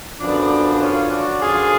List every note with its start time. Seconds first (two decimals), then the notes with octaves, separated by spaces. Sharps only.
0.20 F#2 D3 F3 B3 D4
0.80 C#4 F4
1.10 D4 F#4
1.40 F#2 D3 F3 F4 G#4